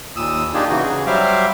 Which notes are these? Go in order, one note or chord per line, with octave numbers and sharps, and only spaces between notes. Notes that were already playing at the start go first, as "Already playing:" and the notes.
D#2 A#2 D#6 E6
A#3 D4 D#4 F4 G4 G#4
C#3 E3 D#4 F#4
C#3 G#4
F#3 G3 C5 E5 F5 D6